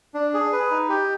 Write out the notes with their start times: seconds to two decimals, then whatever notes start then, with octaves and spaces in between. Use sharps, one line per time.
0.14 D4
0.34 G#4
0.53 B4
0.71 D#4
0.89 G4